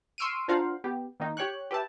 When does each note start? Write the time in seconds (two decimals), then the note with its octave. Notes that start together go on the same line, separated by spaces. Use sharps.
0.18 C6 C#6 E6 F6 D7 D#7
0.48 D4 F4 A#4 C5 F5 F#5
0.84 B3 G4
1.20 D#3 A#3 D#4
1.37 G4 C#5 G5 C#6 F#6
1.71 G4 B4 E5 A5